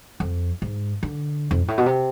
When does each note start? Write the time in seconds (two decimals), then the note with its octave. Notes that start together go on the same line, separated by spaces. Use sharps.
0.20 F2
0.62 G#2
1.03 D3
1.51 F2
1.59 G#2
1.68 A2
1.78 B2
1.86 C3